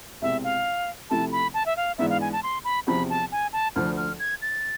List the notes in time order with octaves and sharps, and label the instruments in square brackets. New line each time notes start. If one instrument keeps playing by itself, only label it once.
[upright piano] C2 B2 G#3 C4 [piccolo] E5
[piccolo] F5
[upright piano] C3 F3 A3 E4 [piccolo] A5
[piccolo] B5
A5
E5
F5
[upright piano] G#2 E3 B3 D4 [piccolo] E5
[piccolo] F5
G#5
A5
C6
B5
[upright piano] E2 C3 F3 [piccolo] B5
[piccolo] A5
G#5
A5
[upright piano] D2 D3 F3 [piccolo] F6
[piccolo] F6
G#6
A6